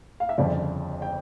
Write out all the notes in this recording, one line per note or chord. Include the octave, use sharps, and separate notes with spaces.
F5
E5
G1 F2 C#3 F3 D5
G5